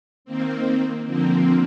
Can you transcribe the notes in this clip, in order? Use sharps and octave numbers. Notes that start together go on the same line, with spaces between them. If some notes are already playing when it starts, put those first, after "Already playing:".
D#3 A#3 C4
D3 F3 A#3 C4